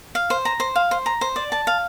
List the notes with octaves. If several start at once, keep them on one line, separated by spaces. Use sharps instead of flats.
F5
C5
A#5
C5
F5
C5
A#5
C5
D5
A5
F5